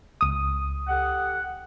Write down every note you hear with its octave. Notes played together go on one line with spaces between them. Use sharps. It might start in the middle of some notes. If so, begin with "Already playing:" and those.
C#2 D#6
G4 A4 F#5